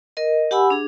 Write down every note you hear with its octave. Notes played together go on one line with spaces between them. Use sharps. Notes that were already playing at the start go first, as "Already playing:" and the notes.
A#4 D#5
G4 F#5 G#5 B5 E6
D4 G#4